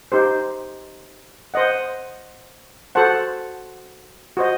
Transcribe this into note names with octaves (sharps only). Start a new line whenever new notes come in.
D#4 G4 C5
C5 D#5 F#5
F#4 A4 C5 F#5 A5
F#4 C5 D#5